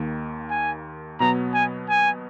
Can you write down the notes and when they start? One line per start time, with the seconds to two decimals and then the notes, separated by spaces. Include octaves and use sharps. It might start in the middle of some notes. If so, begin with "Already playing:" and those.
Already playing: D#2 D#3 A#3
0.50 G#5
1.20 B2 F#3 B3 A#5
1.54 G#5
1.89 G#5